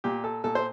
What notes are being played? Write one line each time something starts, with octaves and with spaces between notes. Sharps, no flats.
A#2 G4
A4
A#2 A4
C5